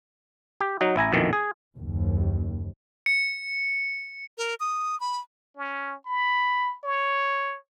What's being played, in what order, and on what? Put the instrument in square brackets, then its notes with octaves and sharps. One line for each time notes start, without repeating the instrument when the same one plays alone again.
[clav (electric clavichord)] G4
F#3 D#4 F#4
A1 E4 G#5 A#5
A#1 F2 B2 D#3 E3
G#4
[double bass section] F#1 D#2
[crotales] C#7
[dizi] A#4
D#6
B5
[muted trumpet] C#4
B5
C#5